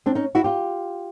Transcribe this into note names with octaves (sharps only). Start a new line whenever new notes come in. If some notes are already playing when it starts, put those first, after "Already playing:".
C4 D4
C#4 D#4
E4 F#4
F4 G4